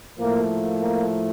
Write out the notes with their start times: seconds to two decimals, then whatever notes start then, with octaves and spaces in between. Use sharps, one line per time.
0.18 A2 F3 A3 A#3
0.49 A#3
0.80 A#3